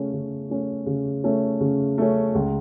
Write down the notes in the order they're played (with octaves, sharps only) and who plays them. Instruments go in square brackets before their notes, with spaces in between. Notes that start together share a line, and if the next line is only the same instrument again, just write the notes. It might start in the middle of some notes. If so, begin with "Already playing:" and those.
Already playing: [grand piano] C#3 A3 C#4
C#3
A3 C#4
C#3
A3 C#4
C#3
A3 C#4
C#2